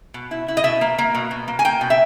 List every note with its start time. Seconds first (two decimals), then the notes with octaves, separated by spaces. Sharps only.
0.14 B2
0.31 E4
0.48 E4
0.57 D#5
0.64 B2 E5
0.81 A#3
0.98 A#3
1.15 B2
1.31 B2
1.48 A#3
1.59 G#5
1.65 A#3 G5
1.81 B2
1.90 E5